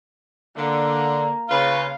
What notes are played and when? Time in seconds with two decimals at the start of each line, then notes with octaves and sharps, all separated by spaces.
0.57 D3 A#3
1.49 C#3 F4 B4 F5